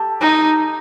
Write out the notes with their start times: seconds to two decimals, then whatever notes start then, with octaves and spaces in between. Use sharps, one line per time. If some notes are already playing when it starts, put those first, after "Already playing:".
Already playing: G4 A4
0.21 D#4